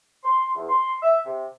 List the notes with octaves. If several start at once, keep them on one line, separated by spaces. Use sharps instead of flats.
C6
E2
C6
E5
C3